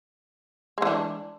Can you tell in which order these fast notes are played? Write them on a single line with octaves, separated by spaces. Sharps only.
G#3 E3 D4